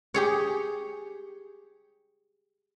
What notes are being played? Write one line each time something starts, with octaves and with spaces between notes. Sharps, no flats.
G4 G#4 C#5